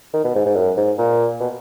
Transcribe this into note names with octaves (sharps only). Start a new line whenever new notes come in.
D#3
B2
G#2
G#2
F#2
G#2
A#2
B2